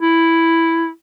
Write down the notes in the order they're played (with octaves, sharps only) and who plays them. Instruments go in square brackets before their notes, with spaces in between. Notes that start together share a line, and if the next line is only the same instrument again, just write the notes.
[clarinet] E4